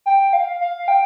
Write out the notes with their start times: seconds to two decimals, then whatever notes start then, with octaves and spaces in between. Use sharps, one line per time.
0.06 G5
0.33 F5
0.61 F5
0.88 G5